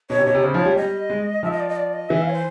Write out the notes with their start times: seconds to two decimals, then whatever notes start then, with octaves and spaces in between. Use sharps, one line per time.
0.10 B2 C#5
0.18 C3
0.26 B2 C#5
0.35 C3
0.44 C#3 C5
0.54 F3 C#5
0.65 G3
0.76 G3 D#5
1.10 G#3
1.43 F3 E5
1.51 D#5
1.60 D5
1.69 D#5
1.76 D5
1.93 D#5
2.09 E3 E5
2.22 F5
2.28 C#5
2.33 C5